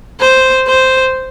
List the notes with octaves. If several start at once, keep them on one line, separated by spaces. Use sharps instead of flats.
C5
C5